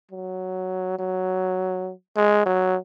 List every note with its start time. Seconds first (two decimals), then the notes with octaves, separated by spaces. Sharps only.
0.11 F#3
0.99 F#3
2.16 G#3
2.45 F#3